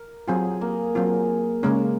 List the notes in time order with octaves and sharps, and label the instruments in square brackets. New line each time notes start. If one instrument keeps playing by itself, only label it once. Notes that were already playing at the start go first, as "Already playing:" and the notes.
Already playing: [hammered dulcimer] A#4
[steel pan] F#3 C4 F4 [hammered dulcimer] G#4
[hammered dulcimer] A#3
[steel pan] F#3 C4 F4
[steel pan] C#3 G#3 C#4 [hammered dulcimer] A#3